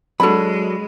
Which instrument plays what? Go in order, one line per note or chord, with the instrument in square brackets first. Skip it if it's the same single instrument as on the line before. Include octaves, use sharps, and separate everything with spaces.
[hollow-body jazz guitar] F#3 D4 F#4 [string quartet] G#3 [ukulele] A4 B5